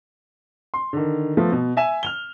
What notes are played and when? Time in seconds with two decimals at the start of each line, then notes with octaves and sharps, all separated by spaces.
0.74 C6
0.93 D3 D#3
1.37 F3 A3 B3
1.52 B2
1.77 E5 G#5 E7
2.03 F6 F7 G7